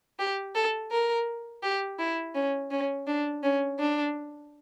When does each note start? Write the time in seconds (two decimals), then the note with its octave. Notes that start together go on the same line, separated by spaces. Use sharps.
0.19 G4
0.55 A4
0.91 A#4
1.63 G4
1.99 E4
2.35 C#4
2.71 C#4
3.07 D4
3.43 C#4
3.79 D4